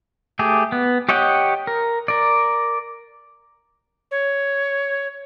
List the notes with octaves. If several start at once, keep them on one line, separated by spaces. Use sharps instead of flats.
A3 G4 G#4
B3
G4 C#5 D#5 F#5 G5
A#4
A#4 D5
C#5